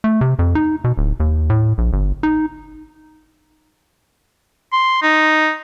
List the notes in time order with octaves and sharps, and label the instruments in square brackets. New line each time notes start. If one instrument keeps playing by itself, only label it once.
[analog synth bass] A3
C3
F2
D#4
B2
D1
D#2
A2
A#1
G1
D#4
[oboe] C6
D#4